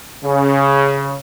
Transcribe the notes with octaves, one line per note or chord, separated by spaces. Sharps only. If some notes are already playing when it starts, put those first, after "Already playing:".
C#3